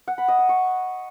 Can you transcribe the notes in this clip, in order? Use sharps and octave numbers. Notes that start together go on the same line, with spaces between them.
F#5
B5
D#5
D#6
C#6